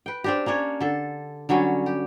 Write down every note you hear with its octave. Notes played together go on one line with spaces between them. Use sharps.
B4 G5
C4 D4 G4
A#3 C#4 D4 C#5
D3 A4
D3 F#3 G3 C#4
G4